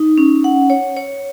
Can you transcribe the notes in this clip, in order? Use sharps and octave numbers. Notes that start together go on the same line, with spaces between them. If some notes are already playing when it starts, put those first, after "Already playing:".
Already playing: D#4
C#4
F#5
C#5
C#5